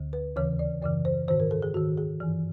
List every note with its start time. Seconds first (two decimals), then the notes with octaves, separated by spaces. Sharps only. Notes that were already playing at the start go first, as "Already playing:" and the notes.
Already playing: D2 D3
0.13 B4
0.36 D#2 C#3 E3 C#5
0.59 D5
0.82 F#2 C#3 E3 D5
1.05 C5
1.28 G#2 D#3 C5
1.40 A#4
1.51 A4
1.62 G#4
1.74 G#2 D#3 F#4
1.97 G#4
2.20 G2 E3